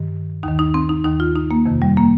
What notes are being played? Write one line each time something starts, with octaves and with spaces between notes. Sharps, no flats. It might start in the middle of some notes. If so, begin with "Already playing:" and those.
Already playing: G2 D#3
D#2 D#3 D#4
D#4
C4
D#4
D#2 D#3 D#4
F4
D#4
A#3
F2 C3 D#3
G3
A#3